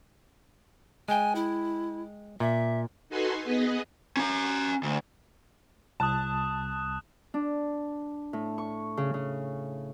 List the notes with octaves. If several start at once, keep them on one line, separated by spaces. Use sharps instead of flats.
G#3 G5 G#5
E4
A#2 E5
D#4 F#4 A4 B4 G#5 C6
B3 G#4 B4 D#5
C#4 A#5
D2
C2 A5 D#6 F#6 E7
D4
A2
C#6
C#3
C#3